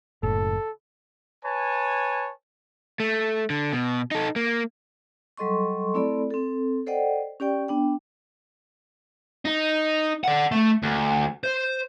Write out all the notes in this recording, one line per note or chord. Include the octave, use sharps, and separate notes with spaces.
F#1 A2 A4
B4 C#5 G#5 A5
A3
D3
B2
D#4 A4
A#3
F#3 G3 A4 D#5 C6 C#6
A3 C4 E4 A4 D5 B5
C4 A4
A4 C5 D5 D#5 F#5 G5
C#4 G4 D5 G5
B3 D4 G5
D#4
D5 F#5
A3
D2
C5